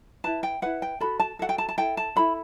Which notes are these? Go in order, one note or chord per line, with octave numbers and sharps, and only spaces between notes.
E4 B4 A5
G5
E4 B4 F#5
G5
F#4 A4 B5
A5
F#4 A4 F#5
G5
A5
A5
E4 A4 G5
A5
E4 A4 B5